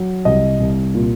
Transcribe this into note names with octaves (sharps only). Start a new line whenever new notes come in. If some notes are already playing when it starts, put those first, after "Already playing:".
Already playing: F#3
C2 D#5
C2
A#2